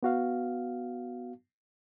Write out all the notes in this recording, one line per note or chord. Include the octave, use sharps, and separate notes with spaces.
B3 F#4 F5